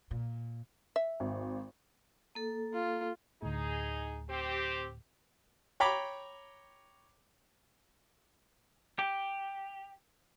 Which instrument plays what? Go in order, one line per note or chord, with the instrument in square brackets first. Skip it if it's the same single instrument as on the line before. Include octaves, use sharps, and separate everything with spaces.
[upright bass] A#2
[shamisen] E5
[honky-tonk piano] G#1
[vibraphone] A#3 A4
[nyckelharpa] F4
[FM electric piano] D2 A2 [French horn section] D#4 G#4
[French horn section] C4 G4
[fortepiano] C#5 G5 A#5 B5 D6
[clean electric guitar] G4